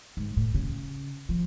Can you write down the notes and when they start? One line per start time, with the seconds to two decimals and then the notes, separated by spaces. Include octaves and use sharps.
0.17 G#2
0.37 A2
0.54 C#3
1.29 F3